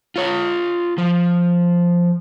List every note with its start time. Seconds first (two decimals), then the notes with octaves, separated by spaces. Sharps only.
0.16 F4 C#5
0.98 F3